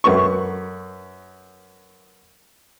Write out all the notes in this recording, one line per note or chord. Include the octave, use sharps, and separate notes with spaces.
F#2 B4 C#6